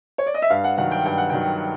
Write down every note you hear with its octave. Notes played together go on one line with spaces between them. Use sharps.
C#5
D5
D#5
E5
G2 F5
F#5
D#3 F#3 F#5
G5
G2 G5
F#5
D#3 F#3 G5